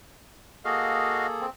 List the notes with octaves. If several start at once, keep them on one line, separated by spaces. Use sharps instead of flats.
A#3 F#4 G#4 A4 D#5 F5
C4